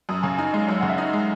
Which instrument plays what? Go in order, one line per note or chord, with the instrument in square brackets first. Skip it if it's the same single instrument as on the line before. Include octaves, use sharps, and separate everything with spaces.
[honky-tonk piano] F#2 [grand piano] D#6
[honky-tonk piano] C#3 [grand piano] G#5
[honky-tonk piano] D#4 [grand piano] G#5
[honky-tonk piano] G#3 [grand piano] D#5
[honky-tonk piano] F#2 [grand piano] C#5
[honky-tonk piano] C#3 [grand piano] F#5
[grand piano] E5
[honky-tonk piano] D#4 [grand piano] D#5
[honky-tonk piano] G#3